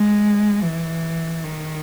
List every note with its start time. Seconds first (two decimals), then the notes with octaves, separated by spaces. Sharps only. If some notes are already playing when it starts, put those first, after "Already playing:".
Already playing: G#3
0.63 E3
1.44 D#3